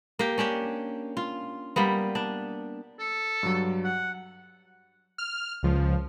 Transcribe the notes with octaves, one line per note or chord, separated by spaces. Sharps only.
A#3 G4
C#4 D4 G4 C#5
F4
G3 A#3 B3
D4
A4
G2 F#3
F#5
F6
C#2 F3